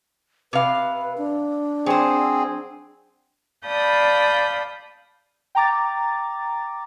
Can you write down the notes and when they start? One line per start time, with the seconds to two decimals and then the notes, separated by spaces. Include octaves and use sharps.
0.53 C3 B4 F5
1.18 D4
1.86 F#3 C4 G#4 C5
3.66 D5 F5 A5 B5 D#6 G6
5.55 G5 A#5 D6 A6